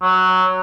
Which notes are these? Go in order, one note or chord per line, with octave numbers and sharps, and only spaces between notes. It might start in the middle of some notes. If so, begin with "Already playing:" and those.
F#3